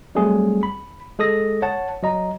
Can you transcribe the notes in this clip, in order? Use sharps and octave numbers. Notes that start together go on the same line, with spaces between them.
F#3 G3 A3 C4 G#4
B5
G#3 A4 D#6 A#6
C#5 F#5 A5
F#3 D#5 A#5